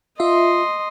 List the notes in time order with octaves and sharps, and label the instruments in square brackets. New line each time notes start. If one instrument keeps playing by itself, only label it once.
[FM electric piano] F4 E5 [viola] D#5 C6